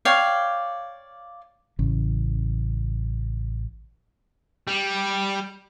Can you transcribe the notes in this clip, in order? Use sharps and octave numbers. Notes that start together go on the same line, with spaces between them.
C#5 D5 F5 G5
A1 C#3
G3